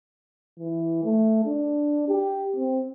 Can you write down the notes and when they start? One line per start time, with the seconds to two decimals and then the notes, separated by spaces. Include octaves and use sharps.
0.59 E3
1.04 A3
1.45 D4
2.08 G4
2.56 C4